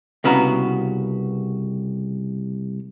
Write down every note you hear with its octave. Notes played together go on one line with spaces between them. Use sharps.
C2 C#3 B3 F#4 A#5